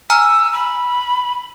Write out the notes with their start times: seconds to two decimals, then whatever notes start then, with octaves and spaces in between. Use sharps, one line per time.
0.10 G#5 A#5 E6 F6
0.53 B5